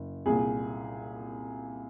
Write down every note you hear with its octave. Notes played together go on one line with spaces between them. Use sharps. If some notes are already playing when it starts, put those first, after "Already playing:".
Already playing: F#1
C2 A#2 G#4